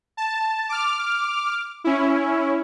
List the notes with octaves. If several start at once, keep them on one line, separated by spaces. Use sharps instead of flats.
A5
D6 F6
C#4 E4